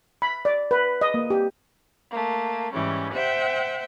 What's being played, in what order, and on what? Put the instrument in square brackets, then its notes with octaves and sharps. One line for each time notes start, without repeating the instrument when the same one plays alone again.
[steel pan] B5
D5
B4
D#5
A#3
G4
[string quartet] A3 A#3
G#2 E3 G3 C#4
C5 E5 F#5 G5